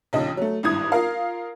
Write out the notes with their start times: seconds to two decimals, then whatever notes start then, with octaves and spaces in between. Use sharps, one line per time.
0.13 A#1 D#2 C#3 D#5
0.37 F#3 A3
0.63 G#1 G2 E4 D#6 G#6
0.92 F4 A#4 F5